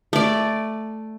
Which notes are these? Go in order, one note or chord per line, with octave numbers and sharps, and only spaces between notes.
A3 D5